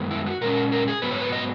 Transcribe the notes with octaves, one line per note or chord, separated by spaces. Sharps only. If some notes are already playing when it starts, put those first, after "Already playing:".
Already playing: F#2 D#3 G#3 B3
E4
F#4
A#2 G#3 C#4 A#4
A#4
G#4
G#2 F#3 B3 B4
C#5
B4
D#5